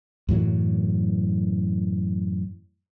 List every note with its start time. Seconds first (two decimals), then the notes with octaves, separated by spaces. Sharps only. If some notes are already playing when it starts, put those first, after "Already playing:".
0.29 F#2 A2 E3 F#3